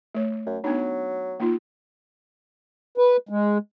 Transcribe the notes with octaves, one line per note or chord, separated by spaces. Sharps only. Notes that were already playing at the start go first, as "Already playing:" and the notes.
A3 C#5
F#2
F#3 B3 D4 D#4
A#3 D#4 F4
B4
G#3